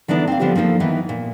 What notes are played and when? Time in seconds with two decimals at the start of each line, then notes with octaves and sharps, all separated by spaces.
0.08 D3 E3 B3 D4 D#4
0.27 C4 F5
0.39 D3 F3 B3 C4 F4 G4
0.55 F3 A#3 D#4 A4
0.80 D#3 E3 B3 D#4
1.09 A#2